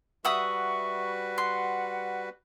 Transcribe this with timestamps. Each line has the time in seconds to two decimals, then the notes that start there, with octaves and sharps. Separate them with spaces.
0.25 G3 F#4 B4 E5 F#5 C#6 D#6
1.38 F#5 C6